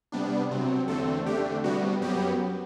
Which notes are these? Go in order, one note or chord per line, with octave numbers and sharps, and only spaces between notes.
C3 G3 B3 D4
C3 F#3 C4
E2 D3 A3 C4 A4
D3 A3 D4 G4
C3 G3 B3 F#4
F#2 F#3 B3 G4